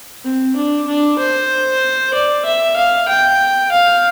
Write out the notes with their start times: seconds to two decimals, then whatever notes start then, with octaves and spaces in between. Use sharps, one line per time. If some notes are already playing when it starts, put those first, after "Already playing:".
0.24 C4
0.56 D4
0.87 D4
1.19 C5
2.14 D5
2.45 E5
2.77 F5
3.08 G5
3.72 F5